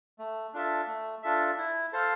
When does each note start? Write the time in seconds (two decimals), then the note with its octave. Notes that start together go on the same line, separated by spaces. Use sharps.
0.19 A3
0.54 D4 F4 A4 E5
0.87 A3
1.23 D4 F4 A4 E5
1.58 E4
1.93 A4 C5 F5